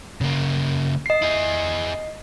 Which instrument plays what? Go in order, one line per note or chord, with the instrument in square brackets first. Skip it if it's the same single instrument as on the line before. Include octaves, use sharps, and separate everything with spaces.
[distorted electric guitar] C#3 A#3
[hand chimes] D#5 C7
[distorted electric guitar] E4 G#4